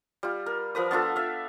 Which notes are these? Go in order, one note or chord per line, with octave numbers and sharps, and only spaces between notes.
G3 F4
A#4
F3 A#4 B4 D#6
B3 D4 F4 A4
E5 F5